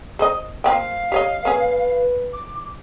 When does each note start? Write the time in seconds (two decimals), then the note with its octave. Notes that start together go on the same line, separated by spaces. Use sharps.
0.19 G#4 C5 D#5
0.64 F3 A#3 F5 G5
1.12 G4 C#5 D#5
1.45 A#3 C#4 G#4 B4
2.33 D6